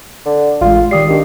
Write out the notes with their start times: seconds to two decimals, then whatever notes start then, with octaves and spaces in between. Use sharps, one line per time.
0.26 D3
0.61 A1 G#3 F4
0.91 D#3 G3 D#6 C7
1.09 D#3 D4 G4